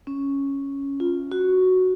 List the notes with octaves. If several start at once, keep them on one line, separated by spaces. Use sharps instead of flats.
C#4
F4
F#4